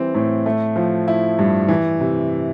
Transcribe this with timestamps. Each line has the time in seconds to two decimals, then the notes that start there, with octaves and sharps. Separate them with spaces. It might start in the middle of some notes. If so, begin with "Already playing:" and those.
Already playing: E3 G3 C4
0.15 A2
0.46 A3
0.76 F3
1.08 E4
1.39 G2
1.68 E3
2.00 C3